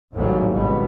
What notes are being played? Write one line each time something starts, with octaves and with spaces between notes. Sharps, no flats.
A1 D#2 G#2 C3 F#3 G3
G#1 C#2 B2 G3 B3